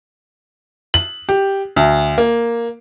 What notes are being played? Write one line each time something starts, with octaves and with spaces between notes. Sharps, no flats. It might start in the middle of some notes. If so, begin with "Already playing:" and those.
F#7
G4
D2
A#3